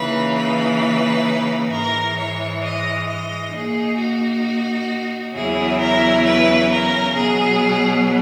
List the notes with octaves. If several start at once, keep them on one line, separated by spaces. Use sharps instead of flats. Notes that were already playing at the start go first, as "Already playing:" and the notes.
Already playing: C#3 E3 A#3 D#4 B4
B4
G#2 E3 G#3 A#4
C#5
D#5
D#5
A#2 A#3 D#4 G#4
F#4
E2 C#3 F#3 C#4 E4 G#4
A#4
B4
A#4
B2 F#3 B3 G#4